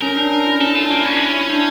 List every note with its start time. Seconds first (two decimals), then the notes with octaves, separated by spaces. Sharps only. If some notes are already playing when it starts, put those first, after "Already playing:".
0.02 C#4 A#4
0.16 D4
0.31 D4
0.47 E4
0.60 C#4 A4
0.75 F4
0.80 D4
0.90 A#3
1.01 C#4 E4
1.16 D4
1.20 C#4 E4
1.34 E4
1.50 D4